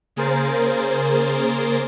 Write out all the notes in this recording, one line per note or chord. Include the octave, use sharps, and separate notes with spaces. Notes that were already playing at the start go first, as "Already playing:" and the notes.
C#3 A#3 G#4 A#4 C5 A6